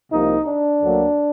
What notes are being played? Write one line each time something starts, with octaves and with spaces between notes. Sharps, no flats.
C2 C3 F3 A#3 D#4
D4
D2 D3 F#3 A#3